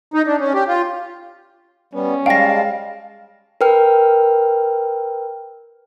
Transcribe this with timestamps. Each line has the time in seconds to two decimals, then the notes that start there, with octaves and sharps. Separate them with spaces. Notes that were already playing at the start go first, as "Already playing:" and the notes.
0.14 D#4
0.27 D4
0.40 C#4
0.54 G4
0.68 F4
1.94 G3 B3 C#4
2.26 G3 G#3 F5 G5 A5 A#6
3.61 A#4 B4 G5 F6